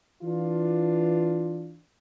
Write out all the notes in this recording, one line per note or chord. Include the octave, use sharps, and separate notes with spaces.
E3 D4 F4